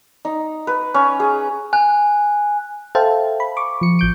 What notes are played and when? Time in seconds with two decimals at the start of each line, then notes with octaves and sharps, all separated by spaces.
0.25 D#4
0.67 B4
0.94 C#4
1.20 G#4
1.73 G#5 F#6
2.95 A4 C5 E5 F5 G5 A5
3.40 B5
3.57 C#6 D6
3.81 F3 C#7
3.99 A1 G6 D7